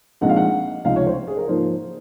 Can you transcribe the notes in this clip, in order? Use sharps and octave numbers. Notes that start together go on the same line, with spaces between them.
A#1 A#2 G#3 C4 D#4 F#5
F5
F#5
C#2 C3 F3 C4 D#4 F5
C#5
C5
G#4
A#4
G#2 F3 A#3 C5